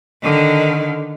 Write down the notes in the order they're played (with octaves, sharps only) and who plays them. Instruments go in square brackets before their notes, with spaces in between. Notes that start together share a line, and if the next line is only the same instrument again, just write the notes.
[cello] D3 D#3